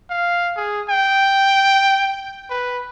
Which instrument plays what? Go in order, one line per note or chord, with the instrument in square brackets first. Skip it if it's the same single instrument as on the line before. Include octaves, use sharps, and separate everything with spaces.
[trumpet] F5
G#4
G5
B4